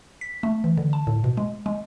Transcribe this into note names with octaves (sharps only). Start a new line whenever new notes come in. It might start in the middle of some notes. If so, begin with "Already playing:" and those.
B6
A3
E3
D3
A5
A2
B2
G#3
G#3